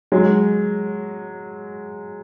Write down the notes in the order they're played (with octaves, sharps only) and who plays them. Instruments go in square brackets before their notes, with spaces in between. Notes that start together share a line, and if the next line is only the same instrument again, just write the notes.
[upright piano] F#3 G#3